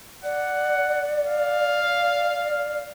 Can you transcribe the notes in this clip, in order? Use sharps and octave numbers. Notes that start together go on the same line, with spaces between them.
D5 F#5
F5